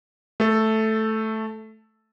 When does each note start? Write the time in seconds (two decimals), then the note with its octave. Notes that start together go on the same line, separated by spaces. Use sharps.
0.40 A3 A4